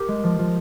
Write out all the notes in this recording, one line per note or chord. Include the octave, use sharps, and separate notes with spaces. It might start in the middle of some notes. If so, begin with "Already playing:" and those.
Already playing: G4 A#4
G#3
F3
F3